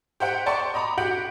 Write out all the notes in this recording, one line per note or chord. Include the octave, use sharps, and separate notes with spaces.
G4 C5 F#5 G5
D5 G5 A5 C6 C#6 C#7
D#5 A#5 B5 D6
F#4 G4 F#5 G6 D7 F#7